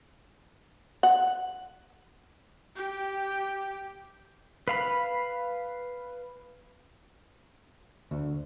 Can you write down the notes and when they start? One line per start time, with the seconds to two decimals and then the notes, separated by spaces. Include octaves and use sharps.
1.03 F#5
2.76 G4 G5
4.68 B4 F5 B5
8.11 D2